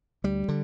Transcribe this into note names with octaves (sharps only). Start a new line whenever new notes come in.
D2 G3
D3